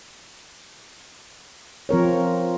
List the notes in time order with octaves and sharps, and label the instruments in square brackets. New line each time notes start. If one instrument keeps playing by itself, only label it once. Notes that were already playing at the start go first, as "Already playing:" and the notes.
[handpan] F3 C4 A#4 C#5